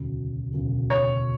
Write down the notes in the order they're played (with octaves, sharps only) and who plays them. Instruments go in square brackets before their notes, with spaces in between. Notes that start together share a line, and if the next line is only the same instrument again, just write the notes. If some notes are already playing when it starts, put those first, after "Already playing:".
Already playing: [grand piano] E1 D2 C#3 F#3
E1 D2 C#3 F#3
[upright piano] C#5